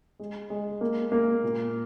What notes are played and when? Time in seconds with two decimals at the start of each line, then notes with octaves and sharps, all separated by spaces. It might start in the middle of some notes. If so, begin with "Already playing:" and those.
0.19 G#3
0.50 G#3
0.81 A#3
1.12 A#3
1.43 A#2